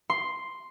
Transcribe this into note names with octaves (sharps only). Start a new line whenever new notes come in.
C6